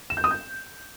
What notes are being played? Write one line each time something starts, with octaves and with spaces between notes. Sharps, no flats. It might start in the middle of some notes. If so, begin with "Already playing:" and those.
E7
G6
D#6
G6